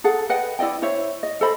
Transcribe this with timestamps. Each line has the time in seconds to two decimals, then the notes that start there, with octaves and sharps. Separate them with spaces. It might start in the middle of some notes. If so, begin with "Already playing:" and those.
0.04 G#4 A4 F#5
0.29 B4 D#5 F#5 G5
0.59 E4 D5 D#5 G5
0.82 E4 C5 C#5 E5
1.23 D#5
1.41 A4 C5 D#5 B5